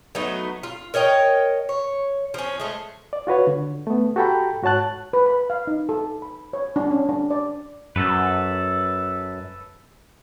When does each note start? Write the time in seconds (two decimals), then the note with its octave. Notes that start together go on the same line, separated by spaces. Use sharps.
0.15 F#3 A3 B3 D#4
0.63 F4
0.94 A#4 C#5 D#5 G5
1.69 C#5
2.34 F3 C#4
2.60 G#3 A3
3.13 D5
3.27 F4 F#4 B4 C#5
3.47 D3
3.87 A3 B3
4.16 F#4 G4 A4 G5 A#5 B5
4.62 G#2 F#4 C#5 A5 F#6
5.13 B4
5.26 B5
5.50 F5
5.67 D#4
5.89 A4
6.22 B5
6.53 C#5
6.76 D4
6.91 C#4
7.09 D4
7.31 D5
7.96 F#2 A4 B4